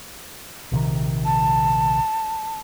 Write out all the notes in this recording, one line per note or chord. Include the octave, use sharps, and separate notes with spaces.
A#1 C3 D#3
A5